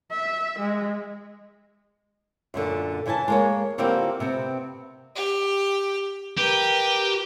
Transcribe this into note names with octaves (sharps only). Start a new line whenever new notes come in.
E5
G#3
F#2 A#2 D3
C#3 E3 E4 G#5 A5
G#3 A#3 C#5
D3 A#3 C4 E4 F4 G4
C3 B3 C4
G4
G4 A#4 B4